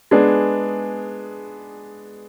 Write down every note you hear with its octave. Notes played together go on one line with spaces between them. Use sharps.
G#3 B3 D4 G#4